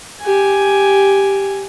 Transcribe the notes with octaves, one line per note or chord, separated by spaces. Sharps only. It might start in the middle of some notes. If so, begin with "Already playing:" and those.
G4 G#5